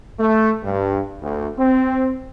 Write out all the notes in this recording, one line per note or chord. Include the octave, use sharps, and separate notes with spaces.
A3
G2
D2
C4